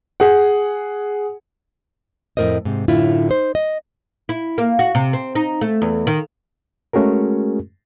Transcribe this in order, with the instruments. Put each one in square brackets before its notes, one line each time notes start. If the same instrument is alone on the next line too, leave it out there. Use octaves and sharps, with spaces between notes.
[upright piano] G#4 F#5
[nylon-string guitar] F2 A2 A#4 C5 D#5
G#2 C3
F#2 A2 D3 E4 F4
D#4 C5
D#5
[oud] E4
A#3
F#4
C3
C4
D#4
A3
E2
D#3
[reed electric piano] G#3 A3 C#4 F#4 G#4 A#4